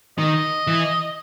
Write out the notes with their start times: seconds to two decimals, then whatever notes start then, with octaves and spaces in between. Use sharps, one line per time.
0.18 D#3 D#5
0.67 E3